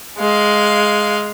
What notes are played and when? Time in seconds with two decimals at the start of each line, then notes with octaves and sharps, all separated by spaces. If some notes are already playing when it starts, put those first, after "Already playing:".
0.18 G#3 F5